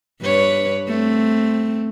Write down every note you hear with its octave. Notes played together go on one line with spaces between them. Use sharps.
G2 B4 C#5
A3 C4